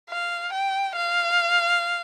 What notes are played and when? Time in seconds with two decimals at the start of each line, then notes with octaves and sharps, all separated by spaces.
0.10 F5
0.53 G5
0.96 F5